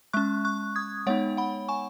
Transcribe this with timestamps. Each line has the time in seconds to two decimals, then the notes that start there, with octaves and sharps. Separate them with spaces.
0.13 G#3 C#4 C#6 F#6
0.45 C#6 F#6
0.76 D#6 G#6
1.07 G#3 B3 D#4 C#5 F#5
1.37 F#5 B5
1.68 G#5 C#6